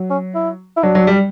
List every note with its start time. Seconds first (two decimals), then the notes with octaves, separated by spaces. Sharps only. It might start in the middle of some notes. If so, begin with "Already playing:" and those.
Already playing: F#3
0.10 C#4
0.35 E4
0.77 E4
0.83 F#3 D4
0.95 F#3
1.07 G3